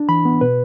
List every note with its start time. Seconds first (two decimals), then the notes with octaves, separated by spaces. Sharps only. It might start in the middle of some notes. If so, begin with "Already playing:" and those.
Already playing: D4
0.09 E3 B5
0.25 B3
0.41 B2 B4